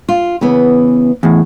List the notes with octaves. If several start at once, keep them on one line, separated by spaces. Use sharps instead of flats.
F4
C#3 E3 B3
E2 A2